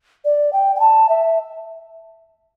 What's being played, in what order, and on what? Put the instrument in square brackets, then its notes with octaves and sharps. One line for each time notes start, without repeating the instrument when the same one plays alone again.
[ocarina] D5
G5
G5
A5
E5